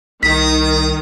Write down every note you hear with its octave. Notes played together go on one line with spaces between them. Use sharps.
C2 D#3 A#5 D#6 B6